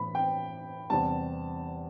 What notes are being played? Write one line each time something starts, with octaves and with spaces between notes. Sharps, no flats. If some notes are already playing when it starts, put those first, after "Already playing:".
Already playing: A2 E3 B3 B5
G5
E2 C3 G3 C4 A5